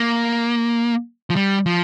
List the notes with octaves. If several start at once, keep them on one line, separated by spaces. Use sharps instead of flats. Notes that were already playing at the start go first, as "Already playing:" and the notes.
Already playing: A#3
F3
G3
F3